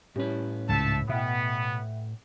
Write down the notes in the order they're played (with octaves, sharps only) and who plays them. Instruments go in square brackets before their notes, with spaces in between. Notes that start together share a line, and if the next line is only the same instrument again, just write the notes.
[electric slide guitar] A2 B4 [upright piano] G3 C#4 E4
[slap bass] C#2 G#2 [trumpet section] A3 E5 A5
[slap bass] B2 [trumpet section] B3 [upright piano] E5 F#5 G5